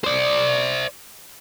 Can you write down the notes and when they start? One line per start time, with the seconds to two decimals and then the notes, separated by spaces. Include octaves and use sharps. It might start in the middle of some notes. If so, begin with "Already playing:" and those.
0.04 C5 D5